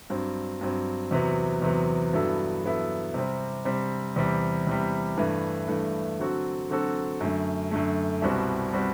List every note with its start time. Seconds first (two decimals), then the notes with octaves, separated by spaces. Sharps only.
0.10 G2 F#3 C4
0.61 G2 F#3 C4
1.11 E2 C3 F#3 B3
1.62 E2 C3 F#3 B3
2.13 G2 F#3 B3 E4 A4
2.64 G2 F#3 B3 E4 A4
3.14 C3 G3 C4
3.65 C3 G3 C4
4.16 E2 C3 G3
4.67 E2 C3 G3
5.18 G2 E3 A3
5.68 G2 E3 A3
6.19 D3 F#3 C4 F#4 A4
6.70 D3 F#3 C4 F#4 A4
7.21 F#2 D3 A3
7.72 F#2 D3 A3
8.22 C2 B2 G3 C4 F#4
8.73 B2 G3 C4 F#4